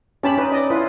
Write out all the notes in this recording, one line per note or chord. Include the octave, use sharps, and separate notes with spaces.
C#4 G4 A5 B5
D#4 B4
D5 D#5
E4 F4 B4